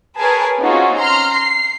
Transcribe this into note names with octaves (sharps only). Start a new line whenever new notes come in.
G#4 A#4 B4 C#5 G#5 A5
C4 C#4 D#4 F4 F#4 G#4
A#5 C6 F6
C7